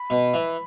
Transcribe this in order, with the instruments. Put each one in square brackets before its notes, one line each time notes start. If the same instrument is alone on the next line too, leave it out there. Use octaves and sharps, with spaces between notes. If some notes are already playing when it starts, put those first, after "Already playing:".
Already playing: [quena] B5
[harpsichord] B2
E3